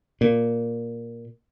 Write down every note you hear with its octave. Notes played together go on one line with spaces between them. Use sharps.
A#2